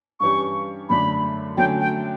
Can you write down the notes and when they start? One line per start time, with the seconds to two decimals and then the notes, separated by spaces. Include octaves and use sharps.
0.20 G2 E3 G3 C#4 G4 C#6
0.89 F#2 D3 A3 D4 B5
1.57 D3 F#3 A3 C#4 G5
1.81 G5